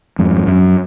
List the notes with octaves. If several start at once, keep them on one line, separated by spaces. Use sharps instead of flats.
F2 G#2
F#2